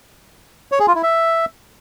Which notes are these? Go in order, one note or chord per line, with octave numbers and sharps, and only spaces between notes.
C#5
G#4
F4
E4
E5